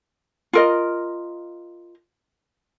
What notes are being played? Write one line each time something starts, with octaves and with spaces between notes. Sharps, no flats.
F4 A#4 D#5